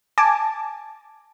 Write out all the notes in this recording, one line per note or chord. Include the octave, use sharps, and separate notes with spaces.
G#5 A5 D6